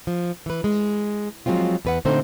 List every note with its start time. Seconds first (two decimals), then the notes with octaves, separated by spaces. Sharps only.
0.07 F3
0.46 E3 B4
0.64 G#3
1.46 F3 F#3 G#3 C4 F4
1.85 E2 B4 F#5
2.05 A#2 D3 A3 C4 D#4 C5